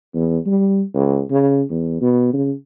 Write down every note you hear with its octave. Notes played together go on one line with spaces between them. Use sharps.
E2
G3
C#2
C#3
E2
B2
C#3